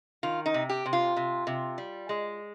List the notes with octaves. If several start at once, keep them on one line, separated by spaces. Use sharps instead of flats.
D#3 F4
D#4
C3
G4
C3
F4
C3
C3
G3
G#3